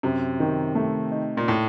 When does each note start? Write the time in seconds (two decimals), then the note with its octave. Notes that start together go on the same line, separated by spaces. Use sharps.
0.03 F#2 C3
0.40 D#3
0.75 A3
1.11 D#4
1.37 A#2
1.48 A2